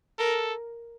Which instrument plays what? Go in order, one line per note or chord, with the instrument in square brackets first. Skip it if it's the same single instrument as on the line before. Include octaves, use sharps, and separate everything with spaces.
[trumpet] A4 [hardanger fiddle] A#4